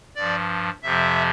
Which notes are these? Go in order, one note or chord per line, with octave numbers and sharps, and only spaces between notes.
G2 F3 D5
F2 C3 F3 E5